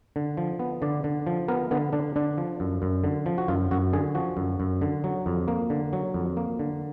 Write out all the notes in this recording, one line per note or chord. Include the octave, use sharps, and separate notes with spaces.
D3
F3
B3
D3 D5
D3
F3
B3 A#4
D3 B3
D3 D4
D3 D4
F3
F#2
F#2
D3
F3
F#4
F#2 F4
F#2 F#4
D3 G#4
F3 F#4
F#2
F#2
D3
F#3
F2
A#3
D3
F#3
F2
A#3
D3